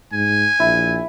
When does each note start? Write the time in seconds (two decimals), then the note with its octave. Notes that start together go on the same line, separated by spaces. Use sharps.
0.13 G#2 G#5
0.60 A#1 E4